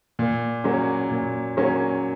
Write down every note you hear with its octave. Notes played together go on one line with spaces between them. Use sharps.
A#2
F#3 A#3 C#4
A#2
F#3 A#3 C#4